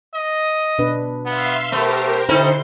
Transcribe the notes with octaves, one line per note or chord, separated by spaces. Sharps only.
D#5
B2 D4 B4
B3 E5 F5 C6
A3 B3 G4 A#4 C5
D3 C4 D#4 E4 A4 B4 C5 C6